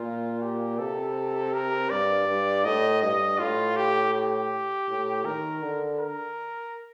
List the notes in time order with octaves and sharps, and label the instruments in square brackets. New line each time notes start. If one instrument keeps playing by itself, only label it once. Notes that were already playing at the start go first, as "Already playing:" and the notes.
Already playing: [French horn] A#2 [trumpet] F4
[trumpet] G4
[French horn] C3 [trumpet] A4
[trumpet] A#4
[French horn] G2 [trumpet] D5
[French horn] G2
[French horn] A2 [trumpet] D#5
[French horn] G2 [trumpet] D#5
[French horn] A2 [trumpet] F4
[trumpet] G4
G4
[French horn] A2
[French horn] D#3 [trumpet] A#4
[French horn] D3
[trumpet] A#4